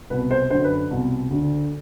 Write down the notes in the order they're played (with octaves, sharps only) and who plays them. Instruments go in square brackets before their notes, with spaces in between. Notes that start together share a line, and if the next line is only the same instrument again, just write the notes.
[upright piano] C2 B2 B4
C5
F#2 D3 C5
B4
C2 B2
D2 D3